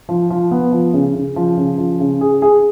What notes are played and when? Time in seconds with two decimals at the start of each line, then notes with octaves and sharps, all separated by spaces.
0.09 F3
0.30 F3
0.51 B3
0.72 F3
0.94 C#3
1.15 C#3
1.36 F3
1.57 C#3
1.78 F3
2.00 C#3
2.21 G#4
2.42 G#4